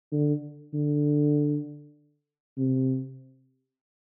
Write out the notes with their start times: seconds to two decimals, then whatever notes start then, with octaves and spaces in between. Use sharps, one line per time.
0.12 D3
0.74 D3
2.58 C3